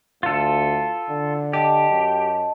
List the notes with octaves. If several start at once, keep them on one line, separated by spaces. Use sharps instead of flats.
D2 F4 A4
D3
G4 D#5 A5
F#2